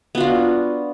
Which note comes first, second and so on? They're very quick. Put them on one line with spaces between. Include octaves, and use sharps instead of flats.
B3 F#4 F4 D4